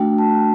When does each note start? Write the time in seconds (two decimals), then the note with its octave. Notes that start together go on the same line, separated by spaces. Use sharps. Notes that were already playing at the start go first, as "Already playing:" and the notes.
Already playing: A3 D4 F#4 G5
0.18 A5